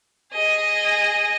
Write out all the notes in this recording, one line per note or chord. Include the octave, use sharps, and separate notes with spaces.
G#4 D#5